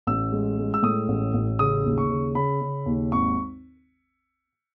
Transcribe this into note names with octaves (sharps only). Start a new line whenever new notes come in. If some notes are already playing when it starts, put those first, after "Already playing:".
A1 E6
G#3
G#3
E6
A2 D#6
A1
A1
C#3 D#6
D#2
C#6
C#3
C#3 B5
C#3
D#2
G#1 C#6